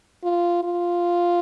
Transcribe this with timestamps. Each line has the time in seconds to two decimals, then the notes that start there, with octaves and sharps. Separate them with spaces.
0.24 F4
0.63 F4